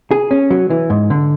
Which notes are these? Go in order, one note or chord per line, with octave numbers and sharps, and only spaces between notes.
G#4
C#4
F#3
E3
G#2
D3